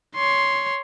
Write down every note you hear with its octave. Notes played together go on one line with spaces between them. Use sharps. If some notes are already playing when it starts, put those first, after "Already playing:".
C#5 C6